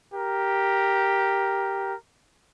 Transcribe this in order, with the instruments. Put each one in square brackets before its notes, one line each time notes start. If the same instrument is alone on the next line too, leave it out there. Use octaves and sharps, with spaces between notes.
[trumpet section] G4 A#4